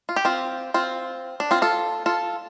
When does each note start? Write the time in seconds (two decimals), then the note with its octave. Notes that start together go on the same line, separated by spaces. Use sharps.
0.09 F4
0.16 G4
0.25 C4 F4
0.74 C4 F4
1.40 D4
1.51 C4 F4
1.62 F4 A4
2.06 F4 A4